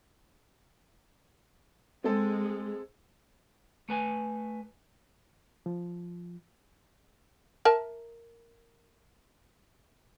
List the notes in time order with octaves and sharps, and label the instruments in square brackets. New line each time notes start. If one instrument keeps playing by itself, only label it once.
[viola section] G#3 [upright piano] C4 A4
[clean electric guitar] A3 B4 G#5
[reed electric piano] F3
[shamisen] A#4 E5 A5